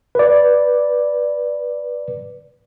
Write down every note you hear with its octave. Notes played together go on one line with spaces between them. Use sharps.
B4 D5